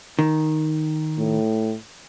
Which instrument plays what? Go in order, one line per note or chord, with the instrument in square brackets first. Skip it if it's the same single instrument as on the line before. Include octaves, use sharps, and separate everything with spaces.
[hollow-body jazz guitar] D#3
[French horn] A2